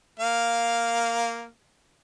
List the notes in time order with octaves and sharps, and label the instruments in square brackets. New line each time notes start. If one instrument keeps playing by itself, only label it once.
[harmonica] A#3 F5